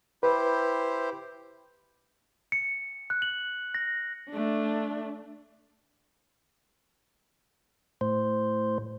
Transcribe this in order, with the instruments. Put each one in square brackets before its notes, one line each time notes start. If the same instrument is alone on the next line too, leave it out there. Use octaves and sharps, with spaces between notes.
[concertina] E4 G4 C5 [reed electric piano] B4
[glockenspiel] C#7
F#6
F#7
A#6
[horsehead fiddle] A3 D4
[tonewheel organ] A2 C5